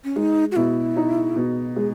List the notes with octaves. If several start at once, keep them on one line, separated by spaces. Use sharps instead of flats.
C#4
G#3 D#4
F#4
B2 E4
D#4
B2
G#3 G#4